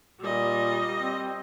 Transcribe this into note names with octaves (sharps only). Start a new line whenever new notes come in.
A#2 G3 D#5
C4